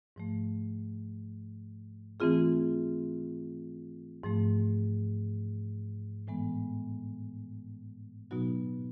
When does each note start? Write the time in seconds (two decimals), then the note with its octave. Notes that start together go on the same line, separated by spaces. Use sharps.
0.16 G#2 F3 A3
2.20 E3 A3 C4 F4 G#4
4.23 G#2 F3 A3
6.27 A2 E3 G#3 B3
8.31 B2 F#3 B3 D#4 F#4